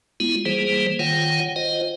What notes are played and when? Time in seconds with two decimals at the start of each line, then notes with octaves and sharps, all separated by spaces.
0.20 G#3 B3 E4 F4
0.45 E3 G3 A#3 G#4 C5
0.99 D#3 F4 C#5 F#5 G5
1.56 F4 C5 D#5